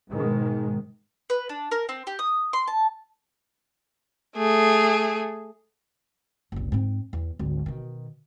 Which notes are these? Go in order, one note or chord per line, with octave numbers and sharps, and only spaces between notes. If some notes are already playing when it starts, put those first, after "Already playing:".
G#2 B2 D#3 G#3
B4
D4
A#4
C4
G4
D#6
C6
A5
A3 G#4
F#1 C2
G#2 C4
E2
G#1 D2
B2 D#3